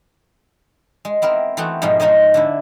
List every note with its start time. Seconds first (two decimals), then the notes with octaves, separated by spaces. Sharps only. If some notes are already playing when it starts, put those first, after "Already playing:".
1.05 G#3
1.22 B3 C4 E4 A#4
1.57 E3 A3 B3 C4 F#4
1.82 G#2 B2 F3 G#3
2.00 F3 G#3 D#4 C5 C#5 D#5
2.34 D3 D4 E4